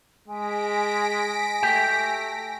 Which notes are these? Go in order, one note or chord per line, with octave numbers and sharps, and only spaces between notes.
G#3 G#5 A#6 B6 D7
A3 G4 G5